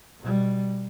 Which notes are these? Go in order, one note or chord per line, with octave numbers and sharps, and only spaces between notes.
B2 G3